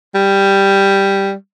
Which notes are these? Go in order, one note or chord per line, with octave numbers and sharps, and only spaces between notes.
G3